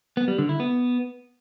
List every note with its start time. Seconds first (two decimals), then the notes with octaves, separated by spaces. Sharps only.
0.17 B3
0.28 G3
0.38 D3
0.49 E4
0.60 B3